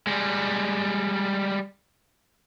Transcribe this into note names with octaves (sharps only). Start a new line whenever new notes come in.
G3 G#3